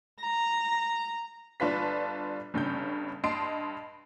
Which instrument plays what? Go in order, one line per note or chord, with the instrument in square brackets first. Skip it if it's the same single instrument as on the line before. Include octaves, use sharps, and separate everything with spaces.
[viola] A#5
[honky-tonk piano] G1 D4 F4 B4 B6
G1 G2 C#3 G6
G2 D#5 A5 C6 C7 D7